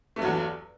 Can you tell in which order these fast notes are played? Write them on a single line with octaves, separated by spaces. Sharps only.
A3 G2 F#3 E2